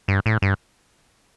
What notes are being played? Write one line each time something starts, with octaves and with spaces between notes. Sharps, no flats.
G2
A2
G2